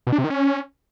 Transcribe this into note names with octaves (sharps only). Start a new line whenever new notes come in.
B2
D4
C3
D#3
C#4